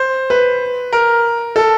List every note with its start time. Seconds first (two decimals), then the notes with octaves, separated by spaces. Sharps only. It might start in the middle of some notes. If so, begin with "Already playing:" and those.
Already playing: C5
0.30 B4
0.93 A#4
1.56 A4